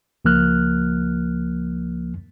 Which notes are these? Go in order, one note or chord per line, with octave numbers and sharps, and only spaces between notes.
C#2 F3 A#3 F6 F#6